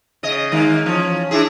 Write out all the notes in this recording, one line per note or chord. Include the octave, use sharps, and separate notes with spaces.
C#3 D#5
D#3 G#3 A#3
E3 F3 C#4
D4 E4 G#4